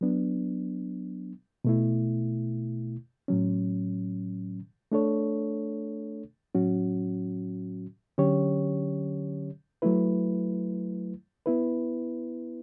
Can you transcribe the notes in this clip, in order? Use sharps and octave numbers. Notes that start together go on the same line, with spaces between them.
F#3 B3 D4
B2 A3 E4
A2 F#3 C#4
A3 D4 A4 C#5
A2 F#3 C#4 F#4
D3 F#3 C#4 G4 C#5
F#3 A3 E4 B4
B3 E4 B4